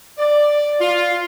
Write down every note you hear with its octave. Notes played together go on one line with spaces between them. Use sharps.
D5
F4